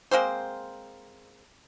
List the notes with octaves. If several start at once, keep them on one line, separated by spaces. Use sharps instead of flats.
G#3 A#3 C4 C5